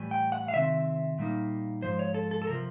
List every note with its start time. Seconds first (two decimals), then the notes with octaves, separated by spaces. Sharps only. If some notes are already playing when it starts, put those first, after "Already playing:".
Already playing: A2 E3 G3
0.11 G5
0.32 F#5
0.48 F5
0.54 C3 D#3 C4 E5
1.19 A#2 G3 A#3 D#4
1.82 G#2 F3 C5
1.99 C#5
2.14 A4
2.31 A4
2.42 A4
2.47 C3 F3 A#4